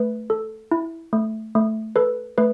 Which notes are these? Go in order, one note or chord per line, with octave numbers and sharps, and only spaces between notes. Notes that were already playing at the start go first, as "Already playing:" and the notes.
Already playing: A3 B4
A4
E4
A3
A3
A4 B4
A3 B4